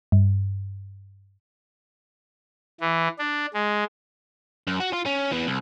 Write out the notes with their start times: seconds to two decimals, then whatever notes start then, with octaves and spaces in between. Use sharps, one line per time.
0.12 G2
2.80 E3
3.19 D4
3.54 G#3
4.67 F#2
4.80 F#4
4.93 F4
5.06 C#4
5.31 E3 B3
5.47 C2